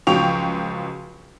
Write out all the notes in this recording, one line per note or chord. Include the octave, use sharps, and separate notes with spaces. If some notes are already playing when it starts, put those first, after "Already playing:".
C#2 F3 F#3 G5 C#6 F7